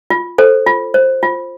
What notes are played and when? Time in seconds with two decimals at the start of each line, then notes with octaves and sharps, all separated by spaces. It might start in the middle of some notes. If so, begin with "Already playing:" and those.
0.10 F4
0.38 A4 C5
0.67 F4
0.94 C5
1.23 F4